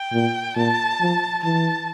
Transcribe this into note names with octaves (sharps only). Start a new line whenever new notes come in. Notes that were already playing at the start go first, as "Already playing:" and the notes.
Already playing: G5
A#2
A#2 A5
F3
E3 A5